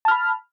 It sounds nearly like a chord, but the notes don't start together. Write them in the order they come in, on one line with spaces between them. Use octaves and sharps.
A5 F6 B5